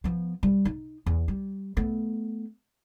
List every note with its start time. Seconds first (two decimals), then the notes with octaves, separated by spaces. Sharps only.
0.04 F3 B3
0.43 G3
0.65 D#4
1.06 E2
1.28 G3
1.77 A3 B3